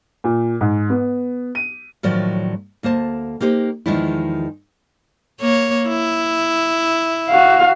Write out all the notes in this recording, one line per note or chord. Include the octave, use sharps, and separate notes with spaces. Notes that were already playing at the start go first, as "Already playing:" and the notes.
A#2
G#2
B3
D#7
A2 D#3 F3 F#3 D5
D2 A#3 C5 A5
A#3 D#4 G4 C5
E2 D#3 F3 G#3 D4 E4
A#3 C#5
E4
F#4 F5